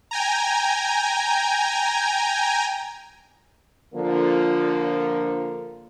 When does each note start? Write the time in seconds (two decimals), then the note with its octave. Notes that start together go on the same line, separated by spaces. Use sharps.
0.11 G5 G#5 A#5
3.95 D3 F3 A#3